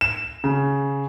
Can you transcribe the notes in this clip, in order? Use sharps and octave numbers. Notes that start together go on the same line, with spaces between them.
E7
C#3